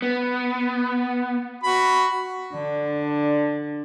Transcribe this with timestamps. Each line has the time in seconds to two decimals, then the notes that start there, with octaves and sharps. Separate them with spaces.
0.02 B3
1.64 F#4 B5
2.53 D3 D4